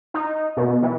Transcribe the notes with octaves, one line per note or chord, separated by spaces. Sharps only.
D#4
B2
E3